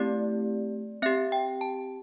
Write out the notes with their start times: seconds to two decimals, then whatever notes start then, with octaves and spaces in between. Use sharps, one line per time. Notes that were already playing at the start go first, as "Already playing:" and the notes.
Already playing: A3 C4 E4 G4 D5
1.02 C4 G4 E5
1.32 G5
1.61 A5